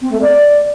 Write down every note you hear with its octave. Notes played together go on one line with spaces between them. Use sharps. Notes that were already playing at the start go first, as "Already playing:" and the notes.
C4
A3
D5